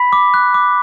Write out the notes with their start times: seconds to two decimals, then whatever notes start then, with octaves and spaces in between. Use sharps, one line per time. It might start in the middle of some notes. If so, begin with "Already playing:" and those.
Already playing: B5 B6
0.13 D6
0.34 F#6
0.54 D6